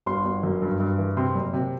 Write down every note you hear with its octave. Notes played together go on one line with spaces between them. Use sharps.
G1 C6
G1
F#2
G2
G2
E3
C3 C6
F#1
C3